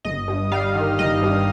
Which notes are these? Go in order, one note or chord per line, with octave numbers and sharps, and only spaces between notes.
G1 D#5
G2
G3 F5
D#3
G1 D#5
G2